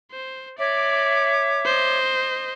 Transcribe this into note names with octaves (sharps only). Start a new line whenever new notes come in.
C5
C#5 D5 E5 D6
C5 D#5